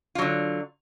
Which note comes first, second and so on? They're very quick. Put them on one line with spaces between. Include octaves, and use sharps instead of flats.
F4 F#3 D3